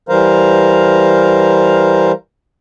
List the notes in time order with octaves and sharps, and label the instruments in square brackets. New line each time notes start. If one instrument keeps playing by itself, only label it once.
[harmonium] E3 G3 A#4 C5 F5 A#5